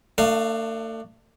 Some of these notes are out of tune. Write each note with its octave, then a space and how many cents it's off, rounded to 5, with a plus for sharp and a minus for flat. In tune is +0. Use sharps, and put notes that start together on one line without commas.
A3 +40 D4 +25 F5 +0